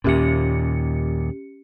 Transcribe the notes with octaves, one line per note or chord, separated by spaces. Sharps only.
D#2 A#2 C#4 G4 C#7